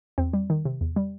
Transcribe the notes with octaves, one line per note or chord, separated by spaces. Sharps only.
E2 C4
G3
D#3
C3
E2
G3